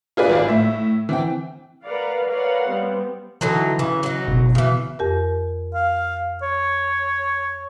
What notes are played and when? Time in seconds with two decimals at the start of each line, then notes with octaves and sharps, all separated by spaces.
0.17 F4 G#4 B4 D5
0.29 G#1 F4 D5
0.48 A2 E5
1.09 E3 C4 G5
1.84 A#4 B4 D5 F5 F#5
2.29 A#4 B4 C#5 D5 F5 F#5
2.68 G3 B3 C4
3.41 D3 E3 F#3 D#4
3.79 C#3 E3
4.03 F#3 D#4
4.27 F#1 B2
4.55 C#3 E3
4.99 F2 G4 A#4
5.74 F5
6.43 C#5